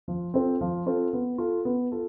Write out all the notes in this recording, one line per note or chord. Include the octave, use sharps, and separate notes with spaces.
F3
C4 F4 A4 C5
F3
C4 F4 A4 C5
B3
F4 A4
B3
F4 A4